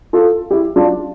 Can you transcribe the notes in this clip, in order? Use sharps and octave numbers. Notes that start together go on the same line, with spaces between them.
F4 A4
E4 G4
D4 F4